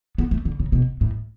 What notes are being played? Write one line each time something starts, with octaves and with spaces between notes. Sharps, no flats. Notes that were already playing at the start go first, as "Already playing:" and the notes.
B3
A3
D3
C#3
B2
A2